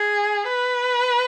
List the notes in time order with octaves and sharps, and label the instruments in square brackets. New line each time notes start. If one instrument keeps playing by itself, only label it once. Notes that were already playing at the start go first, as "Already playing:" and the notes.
Already playing: [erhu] G#4
B4